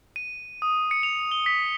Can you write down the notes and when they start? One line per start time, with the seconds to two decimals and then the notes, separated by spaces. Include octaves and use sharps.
0.16 D#7
0.62 D#6
0.91 C#7
1.03 F7
1.32 G7
1.46 B6